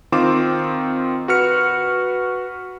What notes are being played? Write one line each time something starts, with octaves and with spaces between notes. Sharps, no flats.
D#3 C4 F4 D6 E7
F#4 B4 F6 C#7